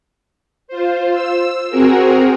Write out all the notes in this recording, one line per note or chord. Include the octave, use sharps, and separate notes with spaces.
F4 C5
E6
C4 F#4 G#4 A#4